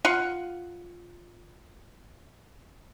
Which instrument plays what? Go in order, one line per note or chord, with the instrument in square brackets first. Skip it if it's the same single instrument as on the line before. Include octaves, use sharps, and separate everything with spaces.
[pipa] F4 F5 F#5